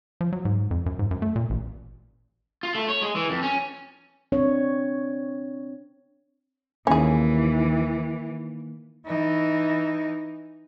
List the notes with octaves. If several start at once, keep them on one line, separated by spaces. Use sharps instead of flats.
F3
F#3
G#2
F2
F#2
G#2
F#2
A3
A#2
A1
F4
A3
C#5
G#3
E3
F2
C#4
C4 D4 C#5
D#2 D#3 E3 A#3 C#4 G#4
E3 D#4